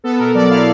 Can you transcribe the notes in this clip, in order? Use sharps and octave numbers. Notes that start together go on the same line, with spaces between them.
B3 A4
B2 A#4
F#3 D5
E4 F5